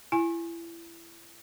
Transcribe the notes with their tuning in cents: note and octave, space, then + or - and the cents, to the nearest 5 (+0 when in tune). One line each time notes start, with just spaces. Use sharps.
E4 +30 G#5 +0